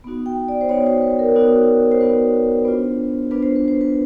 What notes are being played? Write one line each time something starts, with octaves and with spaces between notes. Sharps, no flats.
B3 D#4 F#4
G5
D5
C5
B3 D#4 F#4 C#5
C5
B4
A#4
B3 D#4 F#4
C5
B3 D#4 F#4 B4
B3 D4 F4 C5
B3 D4 F4 B4
C5
B4
C5
B4